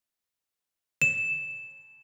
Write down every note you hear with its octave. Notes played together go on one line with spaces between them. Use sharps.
E7